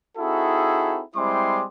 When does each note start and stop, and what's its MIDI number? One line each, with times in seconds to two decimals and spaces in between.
0.18 1.03 60
0.18 1.03 63
0.18 1.03 64
0.18 1.03 66
0.18 1.03 68
0.18 1.03 69
1.16 1.64 55
1.16 1.64 56
1.16 1.64 60
1.16 1.64 64
1.16 1.64 84
1.16 1.64 86